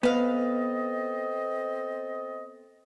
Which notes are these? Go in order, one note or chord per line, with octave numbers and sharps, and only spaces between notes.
B3 C4 A4 B4 D#5 F5